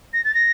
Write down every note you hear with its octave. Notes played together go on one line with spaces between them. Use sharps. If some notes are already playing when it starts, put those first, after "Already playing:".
A#6
A6
A#6